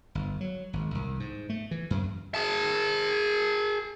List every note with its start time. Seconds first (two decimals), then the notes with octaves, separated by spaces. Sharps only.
0.15 G1
0.41 F#3
0.73 G#1
0.95 C2
1.20 G#2
1.49 A3
1.71 E3
1.90 F#2
2.35 G#4 A5